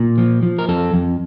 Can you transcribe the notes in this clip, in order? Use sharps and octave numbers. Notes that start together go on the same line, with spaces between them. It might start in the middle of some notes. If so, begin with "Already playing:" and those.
Already playing: A#2
F3
F3
A#4
F2 A4
F2